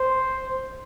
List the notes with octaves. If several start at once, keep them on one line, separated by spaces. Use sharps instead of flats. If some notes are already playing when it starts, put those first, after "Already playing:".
Already playing: C5